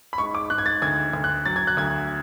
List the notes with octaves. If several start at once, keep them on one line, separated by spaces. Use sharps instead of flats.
B5
G#2 C#6
D6
G#2 F#6
G#6
A6
D2 G#6
D2
F#6
F#3 A6
G#6
F#6
D2 G#6